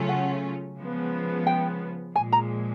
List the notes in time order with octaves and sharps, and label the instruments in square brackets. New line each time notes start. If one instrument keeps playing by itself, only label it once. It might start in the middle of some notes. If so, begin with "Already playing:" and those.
Already playing: [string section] C#3 F#3 A3 C#4 F4
[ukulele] F#5
[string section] C#3 F3 G#3 B3
[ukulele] G5
[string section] A#2 F3 G#3 [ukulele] G#5
[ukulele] A#5